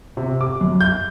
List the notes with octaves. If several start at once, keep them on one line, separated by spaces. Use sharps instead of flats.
C3
D6
F#2
G6